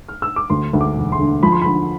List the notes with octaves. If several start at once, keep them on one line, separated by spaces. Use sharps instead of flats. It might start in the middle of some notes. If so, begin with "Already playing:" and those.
F6
E6
D6
D2 C6
D2
D6
E1
C6
D3
F3 B5
C6
D3 B5